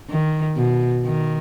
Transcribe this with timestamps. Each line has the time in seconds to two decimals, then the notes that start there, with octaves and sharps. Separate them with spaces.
0.10 D#3
0.57 B2
1.05 D#3